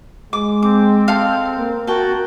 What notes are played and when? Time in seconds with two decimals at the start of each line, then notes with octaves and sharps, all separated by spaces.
0.33 G#3 D6
0.63 C4 D6
1.08 A4 F5
1.59 A#3
1.87 F#4 A#4 G5 A5